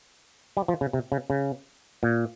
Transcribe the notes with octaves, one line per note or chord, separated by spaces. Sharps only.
G3
F3
C#3
C3
C#3
C#3
A#2